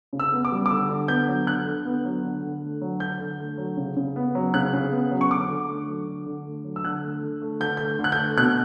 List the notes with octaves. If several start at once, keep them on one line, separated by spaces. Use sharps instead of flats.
C#3
E6
B3
D6
G3
D6
D3 E6
D3
B3 G6
F#3
D3 F#6
D3
B3
F#3
D3
D3
A3
F#3
D3 G6
D3
A3
F#3
C#3
C#3
B3
F#3
C#3 F#6
C#3
B3
F#3
C#6
D3 D6
D3
A3
F#3
D3
D3
A3
F#3
E6
D3 F#6
A3
D3
A3
D3 G6
G6
A3
D3
F#6
G6
A3
B2 F#6